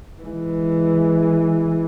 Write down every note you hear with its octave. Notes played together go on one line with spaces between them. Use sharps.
E3 G#3